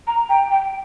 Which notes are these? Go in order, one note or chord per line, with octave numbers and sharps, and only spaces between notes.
A#5
G5
G5